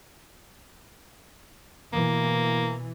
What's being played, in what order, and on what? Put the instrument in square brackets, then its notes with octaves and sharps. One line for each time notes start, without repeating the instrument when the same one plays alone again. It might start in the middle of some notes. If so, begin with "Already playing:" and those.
[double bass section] B2 E3 [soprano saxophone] A#3